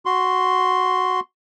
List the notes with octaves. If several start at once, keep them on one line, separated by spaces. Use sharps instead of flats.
F#4 C6